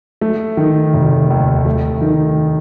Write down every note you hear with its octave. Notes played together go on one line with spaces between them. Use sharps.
A3
D#3
F1
D#2
A3
D#3